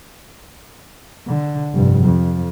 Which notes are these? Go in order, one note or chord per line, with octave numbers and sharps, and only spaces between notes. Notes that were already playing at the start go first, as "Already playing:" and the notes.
D3
F1 G2
F2